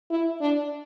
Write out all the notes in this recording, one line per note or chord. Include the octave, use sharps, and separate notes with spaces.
E4
D4